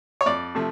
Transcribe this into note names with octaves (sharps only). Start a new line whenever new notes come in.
C#5
F2 D5
C3 F3 A3